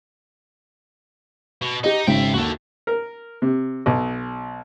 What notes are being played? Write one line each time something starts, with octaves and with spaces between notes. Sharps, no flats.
B2
D#4 G4 D#5
G#1 C#3 E5 G5
D#2 F#4 A4
A#4
C3
B1